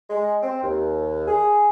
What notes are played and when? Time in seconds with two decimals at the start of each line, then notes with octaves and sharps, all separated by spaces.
0.10 G#3
0.43 C4
0.62 D#2
1.27 G#4